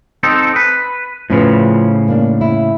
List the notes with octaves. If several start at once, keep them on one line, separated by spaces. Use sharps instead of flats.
C4 D#4 A4
B4
A2 C#3 F3 C#4 B4
A#3 D4
E4